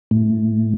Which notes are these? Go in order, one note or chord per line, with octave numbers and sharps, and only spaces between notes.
A2